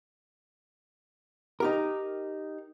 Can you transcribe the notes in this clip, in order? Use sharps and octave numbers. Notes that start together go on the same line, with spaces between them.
D#4 G4 A#4